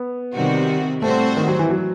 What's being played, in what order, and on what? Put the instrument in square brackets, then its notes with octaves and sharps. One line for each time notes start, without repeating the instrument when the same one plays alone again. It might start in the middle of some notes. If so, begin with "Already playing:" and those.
Already playing: [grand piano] B3
[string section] C3 D#3 G3 C4 F#4
[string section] A2 G3 C4 F#4 C5 [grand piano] A3
[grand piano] D#3
F#3
E3
F#3